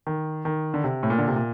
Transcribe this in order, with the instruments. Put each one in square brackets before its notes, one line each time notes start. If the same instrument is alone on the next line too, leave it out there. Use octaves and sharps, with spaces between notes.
[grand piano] D#3
D#3
D3
C3
A2
A#2
D3
C3
A#2